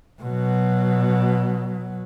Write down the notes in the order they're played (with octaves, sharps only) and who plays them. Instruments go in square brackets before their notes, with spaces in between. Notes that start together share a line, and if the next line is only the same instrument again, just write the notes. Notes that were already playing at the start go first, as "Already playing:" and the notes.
[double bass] B2 F#3